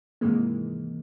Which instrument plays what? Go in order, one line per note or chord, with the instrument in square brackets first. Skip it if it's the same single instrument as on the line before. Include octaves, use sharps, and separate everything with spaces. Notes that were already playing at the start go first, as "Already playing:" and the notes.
[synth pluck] G#2 C3 D#3 E3 G#3 A#3